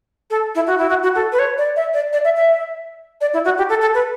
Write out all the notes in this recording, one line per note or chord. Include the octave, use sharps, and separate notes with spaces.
A4
E4
F#4
E4
F#4
F#4
A4
B4
C#5
D5
E5
D5
D5
E5
E5
D5
E4
F#4
G4
A4
A4
B4